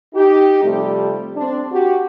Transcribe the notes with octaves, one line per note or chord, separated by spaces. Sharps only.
D#4 G4
C3 F3 G3 A3
C4 D4
F#4 G4